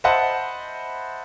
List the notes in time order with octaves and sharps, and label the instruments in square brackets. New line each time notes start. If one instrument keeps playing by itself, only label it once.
[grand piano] C5 D#5 E5 F#5 A5 B5